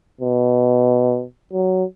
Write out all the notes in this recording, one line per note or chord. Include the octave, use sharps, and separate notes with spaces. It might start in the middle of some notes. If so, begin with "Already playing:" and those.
B2
F#3